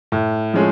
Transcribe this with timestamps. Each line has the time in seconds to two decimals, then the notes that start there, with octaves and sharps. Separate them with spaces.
0.12 A2
0.54 F3 G#3 C#4